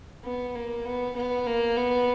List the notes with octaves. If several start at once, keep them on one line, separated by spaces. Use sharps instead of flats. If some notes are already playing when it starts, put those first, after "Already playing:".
B3
A#3
B3
B3
A#3
B3